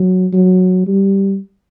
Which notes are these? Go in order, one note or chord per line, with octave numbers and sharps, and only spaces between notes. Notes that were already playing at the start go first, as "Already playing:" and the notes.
Already playing: F#3
F#3
G3